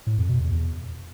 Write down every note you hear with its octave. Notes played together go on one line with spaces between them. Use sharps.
A2
F2
B2
E2
E2